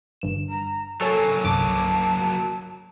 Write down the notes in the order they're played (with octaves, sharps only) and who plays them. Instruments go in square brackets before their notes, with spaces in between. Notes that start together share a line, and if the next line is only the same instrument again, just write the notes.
[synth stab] G1 G2 E7
[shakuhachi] A#5
[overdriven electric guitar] F#3 A#3 [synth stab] A4 C#5 [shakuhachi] G#5
[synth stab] G1 C2 D6 [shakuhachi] A5